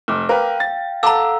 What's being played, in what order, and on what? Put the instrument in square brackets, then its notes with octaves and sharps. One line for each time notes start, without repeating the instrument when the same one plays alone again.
[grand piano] F1 [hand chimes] D6 E6 F6
[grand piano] A#4 B4 [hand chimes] F5 G5
[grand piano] A6
[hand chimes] A4 F5 F#5 [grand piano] A5 D6 [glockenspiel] A#5 E6